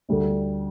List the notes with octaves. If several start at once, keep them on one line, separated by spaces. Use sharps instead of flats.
D2 D3 G3 D4